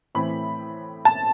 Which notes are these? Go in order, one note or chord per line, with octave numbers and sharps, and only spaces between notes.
A2 E3 A3 C4 B5
A5